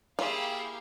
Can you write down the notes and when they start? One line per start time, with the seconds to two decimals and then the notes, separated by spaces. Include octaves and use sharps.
0.19 A#3 E4 F4 G4 G#4 F5